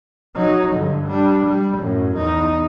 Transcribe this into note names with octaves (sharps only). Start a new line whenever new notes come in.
F#3 D#4
G2 D3
G3 D4
G3
F#2 A2
E2 D#4